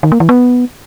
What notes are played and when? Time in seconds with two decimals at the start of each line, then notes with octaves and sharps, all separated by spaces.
0.03 D#3
0.12 A#3
0.20 E3
0.29 B3